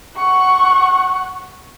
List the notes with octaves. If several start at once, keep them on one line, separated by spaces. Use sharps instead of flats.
F#5 C#6